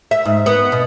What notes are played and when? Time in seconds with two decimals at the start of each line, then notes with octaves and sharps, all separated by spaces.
0.11 E5
0.25 G#2
0.46 B3
0.72 B2